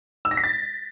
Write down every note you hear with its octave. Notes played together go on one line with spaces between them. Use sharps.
E6
A#6
B6
A6